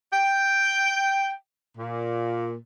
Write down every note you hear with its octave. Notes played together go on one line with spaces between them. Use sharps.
G5
A#2